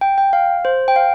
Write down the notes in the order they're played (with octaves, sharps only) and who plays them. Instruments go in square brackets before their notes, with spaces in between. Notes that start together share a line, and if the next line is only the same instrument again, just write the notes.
[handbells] G5
G5
F5
C5
G5
F5